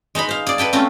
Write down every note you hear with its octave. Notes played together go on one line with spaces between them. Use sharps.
G#3 D#4 A#5 B5
C5 F5
G#4 D5
A4 B4 G5 A5
A3 C4 C#4 F4